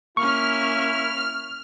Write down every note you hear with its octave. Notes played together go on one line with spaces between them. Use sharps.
A#3 C#4 E4 C#6 F6